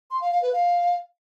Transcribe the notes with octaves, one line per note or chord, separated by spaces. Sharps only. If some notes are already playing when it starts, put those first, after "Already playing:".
C6
F5
F5
B4
F5